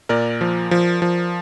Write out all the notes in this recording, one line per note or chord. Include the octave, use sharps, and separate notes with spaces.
A#2 A#4 D5
F3
F3
F3